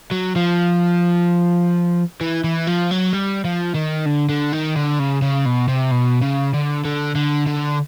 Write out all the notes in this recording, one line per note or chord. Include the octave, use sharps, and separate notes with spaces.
F#3
F3
E3
E3
F3
F#3
G3
F3
D#3
D3
D3
D#3
D3
C#3
C#3
B2
C3
B2
C#3
D3
D3
D3
D3